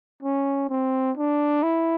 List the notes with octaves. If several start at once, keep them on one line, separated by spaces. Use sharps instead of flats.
C#4
C4
D4
E4